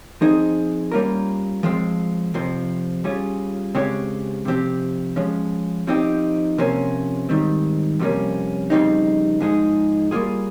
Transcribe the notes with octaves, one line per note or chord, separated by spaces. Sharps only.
F3 C4 D#4 G#4
G3 A#3 C#4 F4 A#4
F3 G#3 C4
F2 C3 F3 C4
G3 C#4 F4 G#4
C#3 G#3 C4 G4 C#5
C3 F3 C4 G4
F3 G#3 C#4
F3 C4 D#4 G4
C3 F3 A#3 C#4
G#2 D#3 G3 C4
F2 C3 G3 A#3 C#4
F2 C#3 G3 C4 D#4
G#2 F3 G#3 D#4 G#4
G3 A#3 F4 G#4